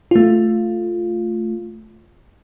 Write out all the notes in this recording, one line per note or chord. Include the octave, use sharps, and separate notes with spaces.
A3 F4